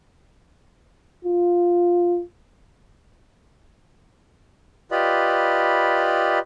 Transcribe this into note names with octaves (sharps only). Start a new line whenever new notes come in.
F4
F4 G4 B4 D5 D#5 B5